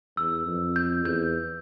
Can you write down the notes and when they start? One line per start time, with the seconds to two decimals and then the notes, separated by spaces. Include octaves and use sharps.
0.17 E2 E6
0.46 F2
0.76 G6
1.05 E2 G6